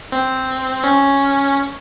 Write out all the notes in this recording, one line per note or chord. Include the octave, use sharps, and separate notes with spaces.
C4
C#4